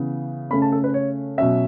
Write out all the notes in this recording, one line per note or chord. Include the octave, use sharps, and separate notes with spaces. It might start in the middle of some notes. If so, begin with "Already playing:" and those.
Already playing: C#3 E3 B3
C#3 A3 C#4 B5
A5
A4
B4
C#5
B2 F#3 C#4 E5